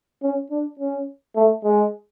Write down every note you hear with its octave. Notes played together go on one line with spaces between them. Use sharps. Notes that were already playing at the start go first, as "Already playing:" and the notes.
C#4
D4
C#4
A3
G#3